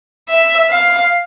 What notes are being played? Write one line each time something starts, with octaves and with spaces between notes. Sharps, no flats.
E5
F5